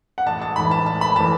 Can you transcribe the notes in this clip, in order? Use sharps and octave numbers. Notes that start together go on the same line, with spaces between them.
F#5
A1 A5
A5
A2 E3 B5
A5
A1 A5
B5
A2 E3 A5